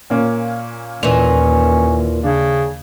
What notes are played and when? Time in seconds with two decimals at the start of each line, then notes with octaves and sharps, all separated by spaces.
0.10 A#2 A#3 C#4
1.03 D#2 A#2 E3 C#4 F7
2.23 C#3 D4